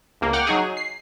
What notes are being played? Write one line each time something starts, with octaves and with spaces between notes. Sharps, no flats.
C#2 A#3
F#5 G5 D6 F6
F#3 D#4 G#4
C7